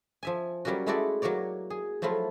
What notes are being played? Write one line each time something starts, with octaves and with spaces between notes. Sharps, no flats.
F3 E5 G#5
F#3 G3 A#3 C#4 F#4
G#3 A3 E4 F#4 A4 D5
F#3 A#3 F#4 C#5 D5
G#4
F3 F#3 A3 E4 F4